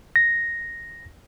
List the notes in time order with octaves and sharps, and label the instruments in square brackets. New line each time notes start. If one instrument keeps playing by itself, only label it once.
[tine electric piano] A#6